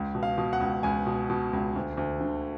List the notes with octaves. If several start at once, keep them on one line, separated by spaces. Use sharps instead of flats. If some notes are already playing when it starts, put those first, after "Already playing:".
Already playing: C#2
B2
F5
B2
F#5
C#2
C#2 G#5
B2
B2
C#2
D2
D2
D3